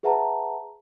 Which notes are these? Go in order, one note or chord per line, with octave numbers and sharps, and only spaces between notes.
G#4 B4 E5 F#5 A5 A#5